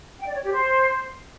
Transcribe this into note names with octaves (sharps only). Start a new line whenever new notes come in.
G5
D5
C#5
G4
C5